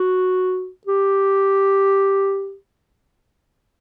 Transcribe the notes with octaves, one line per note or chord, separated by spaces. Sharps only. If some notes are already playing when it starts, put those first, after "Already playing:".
Already playing: F#4
G4